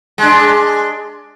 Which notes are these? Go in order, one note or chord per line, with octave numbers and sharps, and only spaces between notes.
G#3 D4